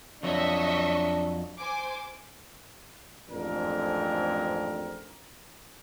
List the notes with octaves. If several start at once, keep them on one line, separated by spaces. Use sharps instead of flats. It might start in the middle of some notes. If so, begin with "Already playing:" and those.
F2 F#3 D4 D#5 E5 C#6
C5 G#5 D6
A1 F2 G#2 C4 D4 A#4